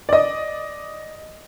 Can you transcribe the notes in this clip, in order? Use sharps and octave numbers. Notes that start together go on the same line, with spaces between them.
D5 D#5